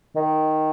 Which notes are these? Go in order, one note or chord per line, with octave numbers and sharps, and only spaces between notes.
D#3